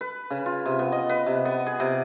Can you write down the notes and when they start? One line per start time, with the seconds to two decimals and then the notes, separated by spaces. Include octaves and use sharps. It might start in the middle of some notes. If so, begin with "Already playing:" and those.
0.01 B4
0.30 C#3
0.46 F4
0.65 C3
0.79 B3
0.92 D#5
1.09 B4
1.26 C3
1.45 B3
1.66 G#4
1.80 C3